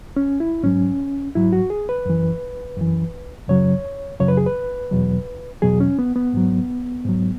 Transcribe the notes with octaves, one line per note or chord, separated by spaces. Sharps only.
C#4
E4
G#2 F#3 C#4
G#2 F#3 E4
F#4
G#4
B4
F#2 E3
F#2 E3
F#2 C#3 F#3 C#5
F#2 C#3 F#3 C#5
B4
G#4
B4
E2 B2 F#3
E2 B2 F#3 G#4
C#4
B3
B3
G#2 F#3
G#2 F#3